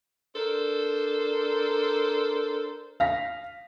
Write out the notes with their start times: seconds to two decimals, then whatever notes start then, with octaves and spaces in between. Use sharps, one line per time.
0.36 D4 A4 A#4 C5
3.00 F5 A#6 B6